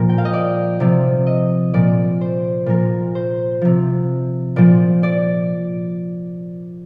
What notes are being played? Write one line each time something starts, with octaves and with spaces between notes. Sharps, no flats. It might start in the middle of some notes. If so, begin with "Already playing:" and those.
Already playing: A#2 F3 A#4
G5
F5
D#5
D5
C3 F3 D5
D#5
A#2 F3 D5
C5
A#2 F3 A#4
C5
C3 F3
A#2 F3 D5
D5